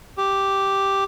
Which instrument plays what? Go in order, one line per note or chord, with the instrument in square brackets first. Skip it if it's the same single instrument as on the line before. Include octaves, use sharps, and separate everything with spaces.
[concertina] G4